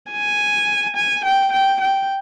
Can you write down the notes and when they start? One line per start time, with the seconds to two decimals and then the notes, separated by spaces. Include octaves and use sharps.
0.11 G#5
0.96 G#5
1.25 G5
1.52 G5
1.81 G5